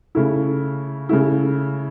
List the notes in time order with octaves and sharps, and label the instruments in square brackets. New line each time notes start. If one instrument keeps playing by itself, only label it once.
[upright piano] C#3 A3 E4
C#3 A3 E4